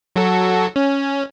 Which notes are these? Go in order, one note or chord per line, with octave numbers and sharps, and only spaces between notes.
F#3 F#4 A4
C#4